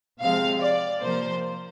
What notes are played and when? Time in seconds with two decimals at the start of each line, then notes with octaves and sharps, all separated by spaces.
0.21 C3 F3 G#3 C4 F5
0.61 D5
1.02 C3 F3 A#3 C5